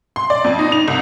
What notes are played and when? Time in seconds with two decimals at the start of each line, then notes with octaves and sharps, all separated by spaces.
0.16 C6
0.30 D5
0.44 F2
0.59 D#4
0.72 F7
0.88 C2